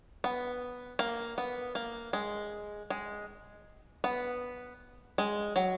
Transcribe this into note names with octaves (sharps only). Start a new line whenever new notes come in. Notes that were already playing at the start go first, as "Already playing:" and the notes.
B3
A#3
B3
A#3
G#3
G#3
B3
G#3
F#3